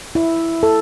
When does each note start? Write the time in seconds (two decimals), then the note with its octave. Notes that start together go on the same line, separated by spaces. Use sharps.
0.15 E4
0.63 A4